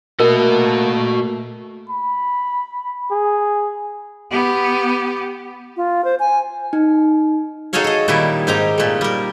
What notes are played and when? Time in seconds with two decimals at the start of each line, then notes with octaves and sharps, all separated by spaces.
0.20 A3 A#3 F#4 A#4 D#5
1.90 B5
3.11 G#4
4.31 B3 G4
5.77 F4
6.04 C5
6.19 G#5
6.73 D#4
7.73 D#4 F#4 G#4 A4 C#5 F5
7.84 A4 D#5
8.08 A#2 D#3 G3 E4
8.47 G#2 C4 D#4 G4 A#5
8.78 A#2 A3
9.01 G3 A#4